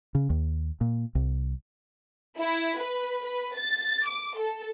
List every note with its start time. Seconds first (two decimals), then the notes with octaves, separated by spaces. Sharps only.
0.15 C#3
0.30 D#2
0.81 A#2
1.15 C2
2.38 E4
2.79 B4
3.25 B4
3.56 A6
4.06 D6
4.38 A4